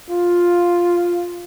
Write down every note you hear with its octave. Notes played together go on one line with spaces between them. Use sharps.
F4